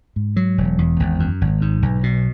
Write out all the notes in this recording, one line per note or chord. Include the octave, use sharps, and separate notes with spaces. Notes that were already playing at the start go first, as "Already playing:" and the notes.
G#2
F#3
E1
E2
G#1
F#2
G#1
G#2
B1
B2